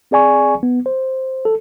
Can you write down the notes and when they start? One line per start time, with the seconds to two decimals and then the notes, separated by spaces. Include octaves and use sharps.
0.11 C4 G#4 D5 G#5 C#6
0.63 B3
0.86 C5
1.45 A4